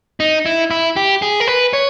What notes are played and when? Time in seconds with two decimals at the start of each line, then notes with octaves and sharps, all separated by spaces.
0.20 D#4
0.46 E4
0.71 E4
0.96 G4
1.22 G#4
1.40 A#4
1.48 B4
1.73 C#5